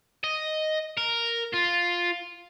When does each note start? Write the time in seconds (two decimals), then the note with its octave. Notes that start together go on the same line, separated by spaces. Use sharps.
0.24 D#5
0.97 A#4
1.54 F4